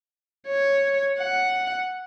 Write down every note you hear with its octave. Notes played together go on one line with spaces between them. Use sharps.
C#5
F#5